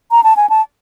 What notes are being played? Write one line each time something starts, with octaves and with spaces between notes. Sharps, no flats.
A#5
A5
G#5
A5